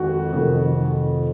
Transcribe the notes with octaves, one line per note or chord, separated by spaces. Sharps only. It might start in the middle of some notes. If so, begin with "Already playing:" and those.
Already playing: F2 D#3 G#3 F#4
F1 F2 D#3